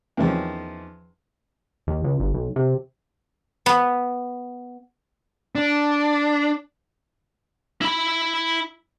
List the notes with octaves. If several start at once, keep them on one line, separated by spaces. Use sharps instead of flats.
E2 D#3 F3 C#4
D#2
C#2
G1
B1
C3
B3
D4
E4 B5